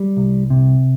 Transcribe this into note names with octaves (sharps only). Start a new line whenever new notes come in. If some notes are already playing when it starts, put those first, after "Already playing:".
Already playing: G3
C2
C3